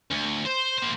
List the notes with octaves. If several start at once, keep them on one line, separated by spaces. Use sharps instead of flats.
D2
C5
A#3 C5